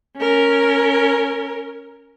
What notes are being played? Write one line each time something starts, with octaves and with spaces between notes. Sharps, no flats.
C#4 A#4